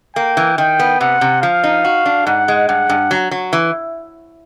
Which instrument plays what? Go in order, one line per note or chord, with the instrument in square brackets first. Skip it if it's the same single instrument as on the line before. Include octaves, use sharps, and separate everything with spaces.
[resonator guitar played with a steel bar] A#3 [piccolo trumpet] G5
[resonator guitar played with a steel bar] E3
[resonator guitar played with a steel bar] D#3 [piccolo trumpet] G5
[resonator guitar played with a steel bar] B3
[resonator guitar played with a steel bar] C3 [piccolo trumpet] F#5
[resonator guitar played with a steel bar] C3
[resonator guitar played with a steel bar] F3 [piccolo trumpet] F5
[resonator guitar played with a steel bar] D#4
F#4
D4
[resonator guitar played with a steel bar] G#2 [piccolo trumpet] F#5
[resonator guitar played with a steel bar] G#3
[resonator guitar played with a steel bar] G2 [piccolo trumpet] F#5
[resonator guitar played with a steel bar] G2
F#3
F#3
E3